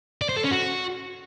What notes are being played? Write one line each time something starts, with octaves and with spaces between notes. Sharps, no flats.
D5
C5
A4
C#4
F#4